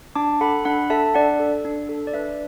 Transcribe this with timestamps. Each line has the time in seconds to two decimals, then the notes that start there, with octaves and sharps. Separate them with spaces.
0.15 D4 A5 D6
0.41 A4 F#5 B5
0.65 D4 F#5 B5
0.90 A4 E5 A5
1.14 D4 D5 F#5
1.39 A4
1.65 D4
1.89 A4
2.07 D5
2.13 D4 B4 E5